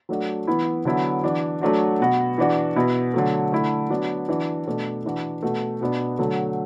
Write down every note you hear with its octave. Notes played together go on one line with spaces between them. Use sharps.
F#3 A3 D4 F#4
E3 B3 E4
D3 F#3 B3 E4
E3 D4 F#4
F#3 A3 D4 F#4
B2 B3 F#4
E3 D4 F#4
B2 B3 E4
D3 F#3 A3
D3 A3 E4
F#3 B3 D4 F#4
E3 D4 F#4
B2 A3 D4
E3 D4 F#4
B2 A3 F#4
B2 B3 D4
D3 F#3 A3